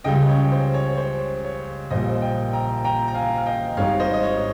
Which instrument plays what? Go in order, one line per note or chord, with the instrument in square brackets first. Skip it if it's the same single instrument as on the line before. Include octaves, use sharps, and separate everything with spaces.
[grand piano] C#2 C#3 G3 D#5 G5
C#5
C5
C#5
C#5
C5
C#5
A#1 A#2 G3 C5 D#5
D#5 G5
G5 A#5
G5 A#5
A#5
F5 G#5
F5
D#5 G5
G#1 G#2 G3 C#5 F5
C5 D#5
D#5
C#5